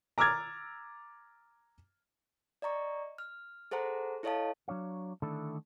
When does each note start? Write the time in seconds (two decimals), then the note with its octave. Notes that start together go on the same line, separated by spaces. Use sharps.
0.18 A#5 D6 E6 F6 G#6 A6
2.62 D5 D#5 A#5 C#6
3.18 F6
3.71 G#4 A4 C5 F#5 A#5
4.23 E4 A4 C#5 D#5 F5 A5
4.68 F#3 D4 C#5 F5
5.22 D3 D#3 A3 D4 E4 A4